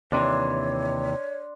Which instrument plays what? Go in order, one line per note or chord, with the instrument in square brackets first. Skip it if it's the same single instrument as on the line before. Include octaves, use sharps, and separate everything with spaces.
[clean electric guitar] D#2 C3 E3 [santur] D4 C6 [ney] C#5